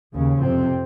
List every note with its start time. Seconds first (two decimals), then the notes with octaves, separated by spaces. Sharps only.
0.14 D#2 C#3
0.41 F2 C3 C4